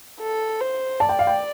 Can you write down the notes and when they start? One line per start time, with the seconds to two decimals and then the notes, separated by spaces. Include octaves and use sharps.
0.21 A4
0.61 C5
1.00 D5 A5
1.09 G5
1.19 F5
1.27 G5